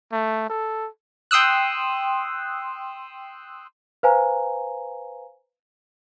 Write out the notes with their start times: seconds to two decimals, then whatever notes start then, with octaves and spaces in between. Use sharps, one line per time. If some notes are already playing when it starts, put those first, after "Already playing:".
0.12 A3
0.50 A4
1.31 G5 C6 D#6 E6 F#6
4.03 B4 C5 F5 G#5 A#5